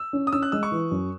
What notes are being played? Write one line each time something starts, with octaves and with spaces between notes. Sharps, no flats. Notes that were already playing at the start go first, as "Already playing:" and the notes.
Already playing: E6
C#4
D#6
C#4 E6
F#6
G#3 E6
C#6
E3
F#2